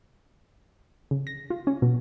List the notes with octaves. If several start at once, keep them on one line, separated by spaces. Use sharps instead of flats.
C#3
A#6
F4
C#4
B2